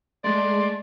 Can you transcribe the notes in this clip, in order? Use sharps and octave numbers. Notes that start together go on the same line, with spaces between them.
G#3 A3 D5 C6